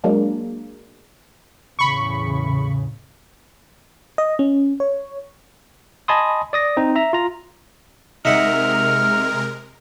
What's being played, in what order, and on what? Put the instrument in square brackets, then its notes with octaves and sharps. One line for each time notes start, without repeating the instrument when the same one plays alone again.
[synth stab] F#3 G#3 A#3 D4
[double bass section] E2 A2 C#3 [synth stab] B5 C#6
[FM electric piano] D#5
C#4
C#5
[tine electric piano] D#5 G#5 A5 B5 C6 D#6
D5 D#6 A#6
C4 D#4
E5 A#5
F4 A#5
[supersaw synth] C3 G#3 A#4 [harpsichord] D#4 E5 F#5 [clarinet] F6